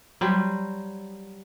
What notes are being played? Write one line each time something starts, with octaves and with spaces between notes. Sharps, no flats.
F#3 G3 C5